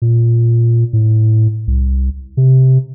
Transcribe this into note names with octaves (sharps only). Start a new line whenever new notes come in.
A#2
A2
C2
C3